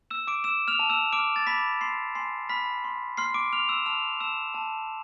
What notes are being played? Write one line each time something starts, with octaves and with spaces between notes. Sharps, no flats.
E6 E7
D6 D7
E6 E7
F6 F7
A5
E6 E7
D6 F6 D7
A6
B5 D6 B6
C6 D6 C7
G#5 C6 C7
B5 F6 B6
C6
C6 F6 C7
D6 D7
F6 F7
E6 E7
A5 F6 F7
A5 E6 E7
A5